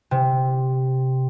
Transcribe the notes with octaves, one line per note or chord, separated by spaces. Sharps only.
C3